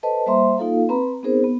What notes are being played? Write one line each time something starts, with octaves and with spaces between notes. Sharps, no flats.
A4 B4 C5 D#5 A5
G3 A#3 C5 E5 A#5 C6
A#3 D#4 F4 A4 F5
C4 B4 A#5 B5
B3 C4 D#4 G#4 A#4 C5
B3